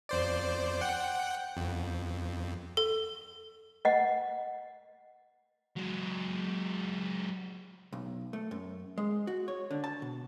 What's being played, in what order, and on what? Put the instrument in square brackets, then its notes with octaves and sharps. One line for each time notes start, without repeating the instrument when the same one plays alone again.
[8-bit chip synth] F2 C5 D5
F#5 G5
F2
[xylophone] A4
[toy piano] D#5 F#5
[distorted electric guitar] F#3 G#3
[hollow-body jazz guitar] B1
A3
F#2
G#3
F#4
C#5
D3
A5
B2